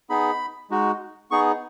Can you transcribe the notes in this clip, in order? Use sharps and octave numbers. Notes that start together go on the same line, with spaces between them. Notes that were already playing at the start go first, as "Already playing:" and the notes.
B3 D#4 G#4 B5
G#3 D#4 F#4
B3 D#4 G#4 C#6